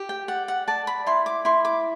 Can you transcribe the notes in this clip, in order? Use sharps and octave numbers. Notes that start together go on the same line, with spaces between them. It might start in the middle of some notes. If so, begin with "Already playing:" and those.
Already playing: G4
G5
D5 F#5
F#5
D5 A5
B5
E4 C6
D6
E4 C6
D6